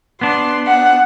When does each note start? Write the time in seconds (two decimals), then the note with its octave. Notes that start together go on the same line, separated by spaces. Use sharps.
0.21 B3 D4 C6
0.67 F#5